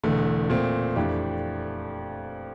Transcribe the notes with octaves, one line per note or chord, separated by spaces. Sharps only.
E1 E2 D3 A3
A#2 A3 C4
F2 E3 A3 D4 G4